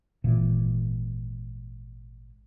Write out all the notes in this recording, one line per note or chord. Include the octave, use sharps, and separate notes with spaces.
G#1 A#2 E3